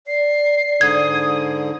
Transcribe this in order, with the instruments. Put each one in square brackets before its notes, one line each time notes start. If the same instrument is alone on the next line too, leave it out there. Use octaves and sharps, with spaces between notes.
[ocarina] D5 [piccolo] C7
[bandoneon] G#2 D3 [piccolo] D#6 [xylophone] G#6